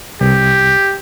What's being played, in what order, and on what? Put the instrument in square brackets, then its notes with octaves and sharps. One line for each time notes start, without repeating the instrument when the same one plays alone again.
[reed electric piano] C2 [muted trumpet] G4